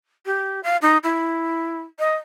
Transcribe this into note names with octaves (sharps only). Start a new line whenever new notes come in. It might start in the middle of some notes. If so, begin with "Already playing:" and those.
G4
F5
D#4
E4
D#5